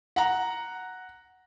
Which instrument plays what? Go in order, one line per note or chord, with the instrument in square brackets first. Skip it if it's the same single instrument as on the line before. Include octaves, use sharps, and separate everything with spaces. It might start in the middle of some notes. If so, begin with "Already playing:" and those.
[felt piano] F#5 A#5